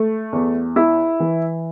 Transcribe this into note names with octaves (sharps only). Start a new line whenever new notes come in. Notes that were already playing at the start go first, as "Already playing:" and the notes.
Already playing: A3
E2
E4
E3